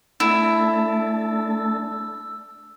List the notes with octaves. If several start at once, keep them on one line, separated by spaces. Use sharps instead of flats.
A3 D4 E4 A5 E6